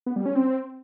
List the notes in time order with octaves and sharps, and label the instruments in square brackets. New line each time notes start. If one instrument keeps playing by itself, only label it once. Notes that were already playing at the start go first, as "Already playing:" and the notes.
[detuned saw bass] B3
G3
C#4
C4